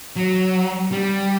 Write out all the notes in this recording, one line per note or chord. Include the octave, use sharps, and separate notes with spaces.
F#3
G3